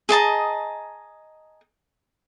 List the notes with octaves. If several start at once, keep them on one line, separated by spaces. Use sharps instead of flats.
G#4 D#5 A5 A#5